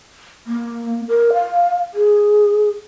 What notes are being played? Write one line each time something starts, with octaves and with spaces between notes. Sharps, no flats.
A#3
A#4
F5
G#4